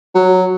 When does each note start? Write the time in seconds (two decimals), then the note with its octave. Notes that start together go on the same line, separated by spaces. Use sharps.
0.15 F#3